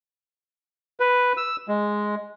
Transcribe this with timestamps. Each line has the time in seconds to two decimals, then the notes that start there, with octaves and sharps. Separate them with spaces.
1.00 B4
1.37 E6
1.68 G#3